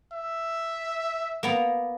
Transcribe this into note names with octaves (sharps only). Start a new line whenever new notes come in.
E5
A#3 B3 A#5